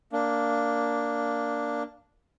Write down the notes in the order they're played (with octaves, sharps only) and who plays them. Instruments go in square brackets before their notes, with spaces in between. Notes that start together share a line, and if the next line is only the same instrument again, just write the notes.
[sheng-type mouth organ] A#3 D4